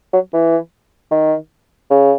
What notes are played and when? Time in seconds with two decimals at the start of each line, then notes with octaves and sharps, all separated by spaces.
0.13 F#3
0.33 E3
1.11 D#3
1.90 C#3